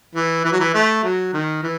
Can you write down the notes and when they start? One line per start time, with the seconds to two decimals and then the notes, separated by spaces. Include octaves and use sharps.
0.15 E3
0.45 E3
0.52 F#3
0.60 E3
0.74 A3
1.03 F#3
1.33 D#3
1.63 E3